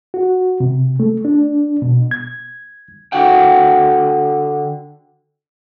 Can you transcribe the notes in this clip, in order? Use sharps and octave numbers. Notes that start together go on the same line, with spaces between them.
F#4
C3
A3
D4
B2
G#6
D3 F#4 F#5 G5